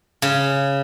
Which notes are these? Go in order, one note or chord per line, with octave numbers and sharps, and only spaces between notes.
C#3